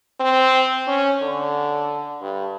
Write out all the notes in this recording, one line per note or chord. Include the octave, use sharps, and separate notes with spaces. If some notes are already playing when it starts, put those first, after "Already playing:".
C4
C#4
D3
G2